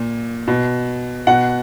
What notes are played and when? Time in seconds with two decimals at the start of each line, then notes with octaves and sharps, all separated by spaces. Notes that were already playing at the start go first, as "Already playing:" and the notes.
Already playing: A#2
0.47 B2
1.27 B2 F#5